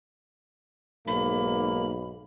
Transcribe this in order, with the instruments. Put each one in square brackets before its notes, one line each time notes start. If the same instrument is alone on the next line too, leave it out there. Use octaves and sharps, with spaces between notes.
[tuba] B1 [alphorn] G#2 [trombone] A#3 [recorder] B5